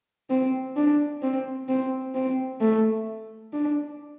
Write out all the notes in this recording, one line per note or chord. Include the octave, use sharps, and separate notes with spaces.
C4
D4
C4
C4
C4
A3
D4